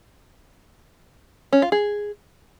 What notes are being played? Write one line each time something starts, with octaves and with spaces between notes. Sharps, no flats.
C#4
F4
G#4